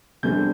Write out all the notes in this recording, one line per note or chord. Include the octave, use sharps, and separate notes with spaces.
E2 D3 G3 C4 G6